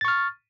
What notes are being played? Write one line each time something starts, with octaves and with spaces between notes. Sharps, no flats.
C#6 F6 A6